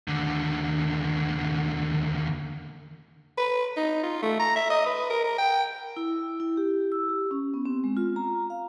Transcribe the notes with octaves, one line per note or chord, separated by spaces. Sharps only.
D#2 D3
B4
D#4
F4
A3
A#5
E5
D#5
B4
A#4
A#4
G5
E4
E4
G4
E6
G4
C#4
B3
C4
G#3
F4
A#5
F5